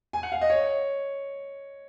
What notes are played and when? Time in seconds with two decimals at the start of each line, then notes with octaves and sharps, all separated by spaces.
0.13 G#5
0.23 F#5
0.32 F5
0.41 D#5
0.50 C#5